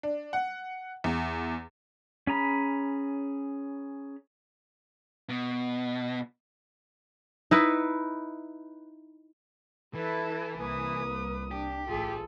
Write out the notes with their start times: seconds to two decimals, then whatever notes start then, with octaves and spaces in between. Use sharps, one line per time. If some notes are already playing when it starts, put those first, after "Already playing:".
0.03 D4
0.33 F#5
1.04 E2
2.27 C#4 G#4 A#5 B5
5.29 B2
7.51 D#4 E4 B4
9.94 E3 E4 A4 B4 A5
10.58 C2 A#3 B4 D#6
11.51 D4 G4
11.88 A1 F4 G#4 A4